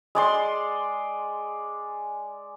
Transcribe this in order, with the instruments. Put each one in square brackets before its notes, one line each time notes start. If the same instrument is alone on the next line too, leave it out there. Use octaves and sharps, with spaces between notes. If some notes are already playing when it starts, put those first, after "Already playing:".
[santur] G#3 D5 C6